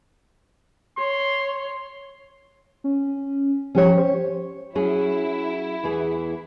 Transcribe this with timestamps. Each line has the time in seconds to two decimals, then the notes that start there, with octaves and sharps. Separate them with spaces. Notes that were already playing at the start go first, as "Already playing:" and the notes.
0.98 C#5 C6
2.84 C#4
3.75 F3 C#4 G4 C#5
3.97 C5
4.75 F#3 C#4 E4 G#4
5.84 E2 E3 G#4